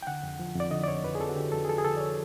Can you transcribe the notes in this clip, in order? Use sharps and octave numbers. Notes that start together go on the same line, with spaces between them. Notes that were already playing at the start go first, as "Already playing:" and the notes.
G5
D3 F#5
F2
F3
F2 D5
D3 D#5
D5
F2 C#5
F2 B4
G#4
F2 A4
F#4
D3 G4
F2 A4
G#4
F3 A4
G#4
D3 A4
D5
C#5